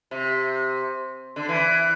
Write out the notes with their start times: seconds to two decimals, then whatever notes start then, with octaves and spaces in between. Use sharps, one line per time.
0.11 C3
1.36 D3
1.49 E3